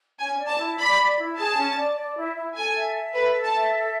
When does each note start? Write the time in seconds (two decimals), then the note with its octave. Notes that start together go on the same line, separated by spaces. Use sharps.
0.19 C#4 G#5
0.39 D5
0.48 A5
0.59 E4
0.78 D5 B5
0.98 D5
1.18 E4
1.37 G#4 A5
1.58 C#4
1.77 D5
1.96 D5
2.16 E4
2.37 E4
2.55 A4 G#5
2.75 E5
2.95 E5
3.14 A4 B4
3.35 A4
3.44 A5
3.54 E5
3.74 A4